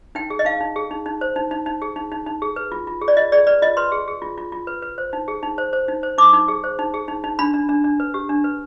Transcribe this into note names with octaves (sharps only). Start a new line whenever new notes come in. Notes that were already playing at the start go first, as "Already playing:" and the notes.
D#4 G5
G#4
D#5
D#4 F5
D#4
G#4
D#4
D#4
C5
D#4
D#4
D#4
G#4
D#4
D#4
D#4
G#4
B4
F4
F4
G#4
D5
F4 D#5
G#4 D5
B4 D5
F4 D#5
B4 C6
G#4
G#4
F4
F4
F4
B4
B4
C5
D#4
G#4
D#4
C5
C5
D#4
C5
D#4 D6
D#4
G#4
C5
D#4
G#4
D#4
D#4
D4 B5
D4
D4
D4
B4
G4
D4
B4